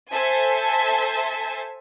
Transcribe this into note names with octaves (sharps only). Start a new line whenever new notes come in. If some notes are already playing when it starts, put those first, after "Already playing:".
A4 C5 E5 G#5 A5